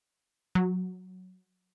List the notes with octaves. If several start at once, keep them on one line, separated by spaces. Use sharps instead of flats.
F#3